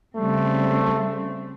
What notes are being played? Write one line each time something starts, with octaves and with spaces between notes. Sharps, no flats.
C#3 G3 A3 C4